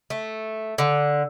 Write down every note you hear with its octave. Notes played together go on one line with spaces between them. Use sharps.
A3
D3